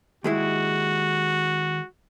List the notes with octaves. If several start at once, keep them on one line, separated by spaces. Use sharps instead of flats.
D#2 G#3 E4 F#4